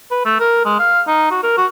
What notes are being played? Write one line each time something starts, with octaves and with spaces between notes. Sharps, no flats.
B4
A3
A#4
G#3
F5
D#4
F#4
A#4
F#4